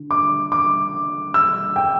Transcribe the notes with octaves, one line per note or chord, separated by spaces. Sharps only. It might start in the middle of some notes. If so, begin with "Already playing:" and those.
Already playing: D3
D6
D6
E6
G5